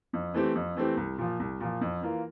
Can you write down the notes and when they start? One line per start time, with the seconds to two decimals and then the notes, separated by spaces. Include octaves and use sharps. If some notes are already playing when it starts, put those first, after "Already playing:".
0.13 F2
0.34 E3 A3 C4 G4
0.55 F2
0.76 E3 A3 C4 G4
0.97 C2
1.18 A#2 F3
1.40 C2
1.60 A#2 F3
1.81 F2
2.02 E3 A#3 F4